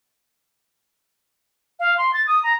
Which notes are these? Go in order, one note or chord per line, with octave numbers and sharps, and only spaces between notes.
F5
C6
A6
D#6
A#5